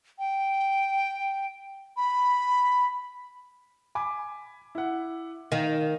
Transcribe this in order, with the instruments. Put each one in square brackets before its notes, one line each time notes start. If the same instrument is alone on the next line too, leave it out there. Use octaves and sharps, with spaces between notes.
[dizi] G5
B5
[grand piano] G#5 B5 D6
E4 F#5
[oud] D#3 [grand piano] F5